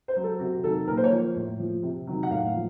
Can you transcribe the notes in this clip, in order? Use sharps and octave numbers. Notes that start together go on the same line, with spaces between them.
C5
F#3
A4
C3 F#4
D#3 F#3 A4
A#2 A#4
C5
C#5
F3
A2
F3
C3
D#3 F#3
F#5
A2 F5
F3